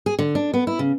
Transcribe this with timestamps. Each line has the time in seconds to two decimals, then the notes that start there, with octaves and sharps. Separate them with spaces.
0.06 G#4
0.19 D3
0.35 D4
0.54 B3
0.67 E4
0.79 C#3